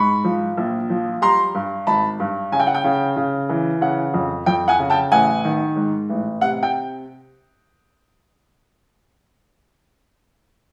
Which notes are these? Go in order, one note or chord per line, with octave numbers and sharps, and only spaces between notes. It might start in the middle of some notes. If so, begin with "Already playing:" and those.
Already playing: G#2 B5 C#6
F3
A#1
F3
G3 A#5 C6
G2
G#1 A5 B5
G2
C#3 G#5
G5
F#5
G5
C#3
C#3
E3
C#3 F#5
F2
F2 G5
F#5 G#5
C#3
G5 A5
A1 F#5 G#5
D#3
G#2
A1
C3 F#5
G5